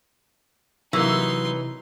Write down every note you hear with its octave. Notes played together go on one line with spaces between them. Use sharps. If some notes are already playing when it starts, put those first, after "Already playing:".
C3 E3 F#3 A#3 D#4 E4 C6